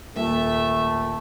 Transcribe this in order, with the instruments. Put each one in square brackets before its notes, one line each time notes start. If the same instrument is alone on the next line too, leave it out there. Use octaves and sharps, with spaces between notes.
[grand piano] D#1 [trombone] A3 [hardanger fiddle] E5